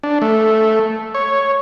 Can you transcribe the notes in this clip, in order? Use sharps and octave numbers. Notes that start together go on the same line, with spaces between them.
D4
A3
C#5